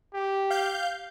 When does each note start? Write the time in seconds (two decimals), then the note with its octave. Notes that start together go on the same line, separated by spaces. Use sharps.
0.14 G4
0.50 F5 G6